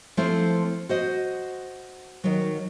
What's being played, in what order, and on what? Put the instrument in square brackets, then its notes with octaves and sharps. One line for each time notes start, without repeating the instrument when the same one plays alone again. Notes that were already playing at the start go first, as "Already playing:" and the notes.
[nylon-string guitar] F3 A3 C4 E4 C5
F#4 C5 D#5
D#3 F#3